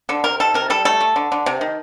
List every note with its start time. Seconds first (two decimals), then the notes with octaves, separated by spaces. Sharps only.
0.09 D3 A4
0.24 C3 A#4
0.40 D#3 A4
0.54 C3 A#4
0.70 G3 A4
0.85 A3 A4
1.01 A3
1.16 D3
1.32 D3
1.46 C3
1.61 D#3